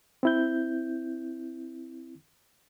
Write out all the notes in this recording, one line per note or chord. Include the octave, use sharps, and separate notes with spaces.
C4 E4 G6